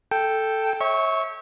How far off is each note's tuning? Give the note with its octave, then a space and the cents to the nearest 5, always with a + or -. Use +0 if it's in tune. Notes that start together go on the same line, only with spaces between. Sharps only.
A4 +0 G5 +0
C#5 -35 E5 -30 C#6 +0